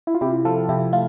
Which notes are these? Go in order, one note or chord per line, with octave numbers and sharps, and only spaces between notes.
E4
F4
C3 E4 G4
F3 F4 A4
C3 E4 G4
A3 F4